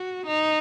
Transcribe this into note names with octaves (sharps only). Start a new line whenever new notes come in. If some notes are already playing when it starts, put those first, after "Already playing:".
Already playing: F#4
D#4